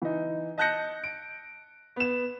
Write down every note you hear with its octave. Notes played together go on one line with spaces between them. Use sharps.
E3 D#4
D#5 A5 F#6 G6 A#6 C#7
D7
B3 E7